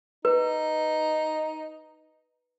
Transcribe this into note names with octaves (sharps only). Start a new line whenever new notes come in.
D#4 B4